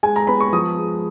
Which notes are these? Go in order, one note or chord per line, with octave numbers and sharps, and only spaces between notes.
G#3 G#5
A#5
B3 B5
C#6
F3 D#6
G#3